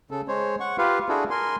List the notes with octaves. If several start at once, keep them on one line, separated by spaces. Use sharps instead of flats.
C#3 A4
G#3 C5 C#5
F#5 C#6
F4 G4 B4 F5
D4 E4 F#4 G#4 A4
A#4 G#5 C6